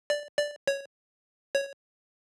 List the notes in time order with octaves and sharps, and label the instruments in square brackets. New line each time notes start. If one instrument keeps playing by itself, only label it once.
[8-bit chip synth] D5
D5
C#5
C#5